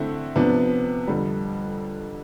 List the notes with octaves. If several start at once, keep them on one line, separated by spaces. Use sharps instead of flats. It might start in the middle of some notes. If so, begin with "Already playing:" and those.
Already playing: D3 A3 C4 E4
C3 F3 B3 D4
F2 D3 G3